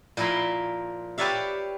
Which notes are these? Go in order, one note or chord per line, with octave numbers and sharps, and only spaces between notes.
A#2 F3 E4 A#4 B5 C6
G4 B4 C#5 D5 E5 F5